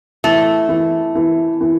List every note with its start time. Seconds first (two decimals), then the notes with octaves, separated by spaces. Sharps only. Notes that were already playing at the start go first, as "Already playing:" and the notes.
0.24 E3 A3
0.69 E3
1.15 E3
1.61 E3